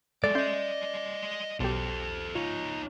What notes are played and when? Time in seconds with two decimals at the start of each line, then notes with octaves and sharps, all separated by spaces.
0.24 G#3 A3 A4 D5
0.35 C#4 D#5 E5 C6 G6
1.60 B1 G4 A4 C5
2.35 D#4 F4 C#5